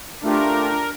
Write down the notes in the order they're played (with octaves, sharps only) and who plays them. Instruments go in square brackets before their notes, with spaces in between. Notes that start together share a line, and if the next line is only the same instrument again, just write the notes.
[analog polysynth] A3 F4 G4 [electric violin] D4 [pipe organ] A#4